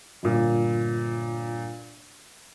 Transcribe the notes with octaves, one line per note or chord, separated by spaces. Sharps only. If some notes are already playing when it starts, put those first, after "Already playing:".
G1 A#2